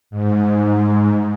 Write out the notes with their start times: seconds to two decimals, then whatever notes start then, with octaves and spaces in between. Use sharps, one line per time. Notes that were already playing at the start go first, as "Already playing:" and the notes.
0.10 G#2